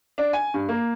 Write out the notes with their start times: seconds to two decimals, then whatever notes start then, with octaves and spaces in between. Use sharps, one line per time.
0.18 D4
0.33 G#5
0.54 G2
0.69 A#3